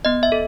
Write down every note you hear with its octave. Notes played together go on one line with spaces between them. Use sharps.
B3 D#5
E5
A4